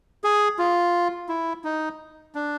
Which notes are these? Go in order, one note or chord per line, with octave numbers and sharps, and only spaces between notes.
G#4
F4
E4
D#4
D4